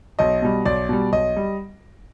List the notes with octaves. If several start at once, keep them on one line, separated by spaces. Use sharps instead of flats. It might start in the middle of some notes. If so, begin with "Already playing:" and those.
B1 D#5
B2 G3
B1 D5
B2 G3
B1 D#5
G3